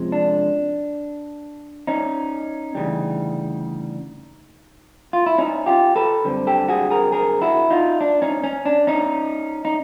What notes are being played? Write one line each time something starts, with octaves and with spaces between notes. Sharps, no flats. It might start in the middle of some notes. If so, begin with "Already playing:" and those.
Already playing: C3 F3 G#3 C#4
D4
C#4 D#4
D2 C#3 E3 G3
F4
E4
C#4 D#4
F4 G4
A4 B4
F#2 D3 G3 C4
G4 A4
F#4 G#4
G#4 A#4
G#4 A#4
E4 F#4
D#4 F4
D4
C#4 D#4
C#4
D4
C#4 D#4
D#4